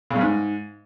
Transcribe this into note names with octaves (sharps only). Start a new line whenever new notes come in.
C#3
G2
G#2